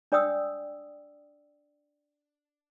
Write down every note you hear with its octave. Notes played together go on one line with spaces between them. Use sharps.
D4 D5 G5 D#6 E6